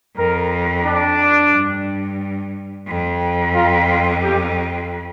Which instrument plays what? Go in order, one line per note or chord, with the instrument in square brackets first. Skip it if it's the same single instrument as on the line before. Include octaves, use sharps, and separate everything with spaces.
[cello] F2 [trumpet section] A#4
[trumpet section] D4
[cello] G2
F2
[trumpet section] F4
F4
G4